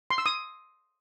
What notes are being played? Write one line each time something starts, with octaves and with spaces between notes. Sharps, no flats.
C6
E6
D#6